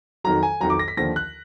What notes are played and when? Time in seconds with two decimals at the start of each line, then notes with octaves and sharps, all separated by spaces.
0.24 F2 D#3 F#3 A#5
0.43 G#5
0.60 F2 D#3 F#3 A#5
0.70 D6
0.79 A#6
0.88 B6
0.97 D#2 D3 F3 A#6
1.16 F#6